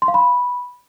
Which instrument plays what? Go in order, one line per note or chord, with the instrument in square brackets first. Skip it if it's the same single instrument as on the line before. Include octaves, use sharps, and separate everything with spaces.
[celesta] C6
F5
B5